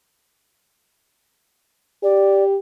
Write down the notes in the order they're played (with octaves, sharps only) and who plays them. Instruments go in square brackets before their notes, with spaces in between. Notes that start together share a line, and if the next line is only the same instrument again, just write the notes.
[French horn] G4 [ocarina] D5